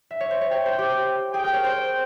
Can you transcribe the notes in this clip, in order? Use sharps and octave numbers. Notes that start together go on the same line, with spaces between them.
E5
C#5
C5
C#5
C#5 G5
C5
G4
G#4 G5
A#4
C#5
C5